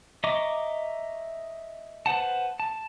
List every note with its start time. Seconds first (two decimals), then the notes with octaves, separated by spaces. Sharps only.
0.24 D#5 E5 A#5 C#6 D6
2.06 B4 C5 F#5 A5
2.60 A5